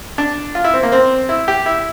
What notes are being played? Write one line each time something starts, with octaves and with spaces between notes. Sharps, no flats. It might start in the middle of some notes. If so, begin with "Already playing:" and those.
D4
F4
E4
C4
A#3
C4
E4
G4
E4